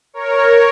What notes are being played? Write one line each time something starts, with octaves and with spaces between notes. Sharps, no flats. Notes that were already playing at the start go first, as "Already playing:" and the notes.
A#4 C#5